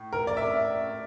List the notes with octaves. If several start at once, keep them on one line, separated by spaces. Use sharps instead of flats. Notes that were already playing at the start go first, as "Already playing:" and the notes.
Already playing: A2
A#4
D5
E5